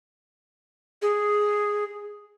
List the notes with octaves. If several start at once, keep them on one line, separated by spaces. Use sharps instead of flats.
G#4